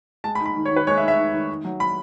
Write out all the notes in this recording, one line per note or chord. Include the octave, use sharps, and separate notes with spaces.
G#3 A5
B5
D#4
B5
D#3
C#5
D#3
B4
G#3 C#5
E5
D#4
E5
D#3
D#3
D#3
F#3
B5